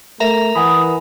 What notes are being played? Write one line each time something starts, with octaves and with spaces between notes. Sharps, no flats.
A3 A#4 E5 A#5
E3 F#5 G#5 B5 D#6